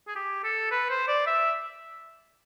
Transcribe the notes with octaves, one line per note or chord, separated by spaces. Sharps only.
G#4
G4
A4
B4
C5
D5
E5